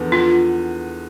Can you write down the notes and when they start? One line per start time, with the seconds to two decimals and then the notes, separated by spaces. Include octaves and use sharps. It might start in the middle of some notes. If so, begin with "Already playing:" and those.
Already playing: E2 D3 F3 B3
0.12 F4